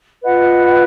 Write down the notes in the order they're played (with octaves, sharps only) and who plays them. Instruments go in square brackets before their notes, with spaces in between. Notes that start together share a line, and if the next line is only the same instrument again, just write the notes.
[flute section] F4 B4 D#5 F#5